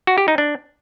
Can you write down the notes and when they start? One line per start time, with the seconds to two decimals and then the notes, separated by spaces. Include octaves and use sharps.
0.07 F#4
0.18 G4
0.28 D#4
0.38 D4